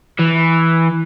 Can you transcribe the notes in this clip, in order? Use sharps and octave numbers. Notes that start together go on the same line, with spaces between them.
E3